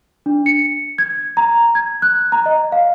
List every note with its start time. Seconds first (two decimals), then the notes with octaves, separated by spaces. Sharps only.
0.26 D4
0.46 C#7
0.98 G#6
1.37 A#5
1.75 G#6
2.02 F#6
2.32 A#5
2.46 D#5
2.72 F5